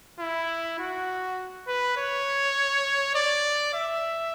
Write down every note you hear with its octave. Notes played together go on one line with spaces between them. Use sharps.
E4
F#4
B4
C#5
D5
E5